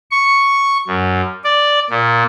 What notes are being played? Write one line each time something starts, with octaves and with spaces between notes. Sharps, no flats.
C#6
F#2
D5
A#2